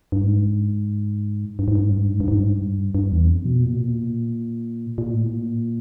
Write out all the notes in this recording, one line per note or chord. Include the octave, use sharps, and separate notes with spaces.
G2
G#2
G2
G#2
G2
G#2
G2
G#2
G2
G#2
G2
G#2
G2
G#2
G2
G2
E2
F2
B2
A#2
B2
A#2
A#2
A2
A#2